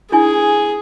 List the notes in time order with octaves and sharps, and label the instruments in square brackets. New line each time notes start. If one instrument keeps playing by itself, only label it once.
[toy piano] D4 E4 G#5 [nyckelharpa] G#4